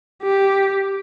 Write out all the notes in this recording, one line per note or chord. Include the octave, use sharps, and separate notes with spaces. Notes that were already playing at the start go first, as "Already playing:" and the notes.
G4